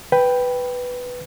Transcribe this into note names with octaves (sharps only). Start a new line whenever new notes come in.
B4 G5